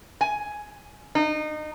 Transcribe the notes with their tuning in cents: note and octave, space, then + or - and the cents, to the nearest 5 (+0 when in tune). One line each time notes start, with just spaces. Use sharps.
G#5 +10
D#4 -25